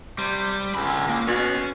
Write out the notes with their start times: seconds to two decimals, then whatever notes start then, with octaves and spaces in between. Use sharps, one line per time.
0.18 C3 G3
0.75 C#2 D3 B5
1.09 A#3
1.28 B2 C#4